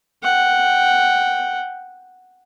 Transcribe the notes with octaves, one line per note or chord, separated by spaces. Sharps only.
F#5 G5